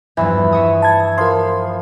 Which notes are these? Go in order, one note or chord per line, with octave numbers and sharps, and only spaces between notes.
E2 G2 E3 F3
E5 C#6 D#6
A5 G#6
F3 A#4 C6